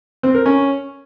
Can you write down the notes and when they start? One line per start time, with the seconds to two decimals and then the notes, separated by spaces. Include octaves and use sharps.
0.23 C4
0.35 A#4
0.46 C#4